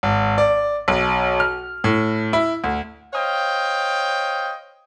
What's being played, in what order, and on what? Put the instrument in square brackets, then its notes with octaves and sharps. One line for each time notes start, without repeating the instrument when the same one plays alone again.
[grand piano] G#1
D5
B1
F6
A2
E4
D2
[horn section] C5 C#5 D#5 F5 G5